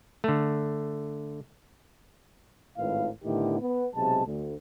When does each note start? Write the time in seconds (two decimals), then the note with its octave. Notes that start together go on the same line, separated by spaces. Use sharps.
0.24 D3 A3
2.78 G#1 A2 D#3 F4 B4 F5
3.24 A2 D3 D#3 B3 E4 G4
3.60 B3
3.95 B1 C3 G#3 A5
4.26 D2